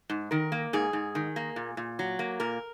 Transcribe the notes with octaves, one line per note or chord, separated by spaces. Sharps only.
G#2
D#3 A#4
A#3
G#2 G#4
G#2
D#3
A#3
A#2
A#2
F#3
A#3
A#2 A#4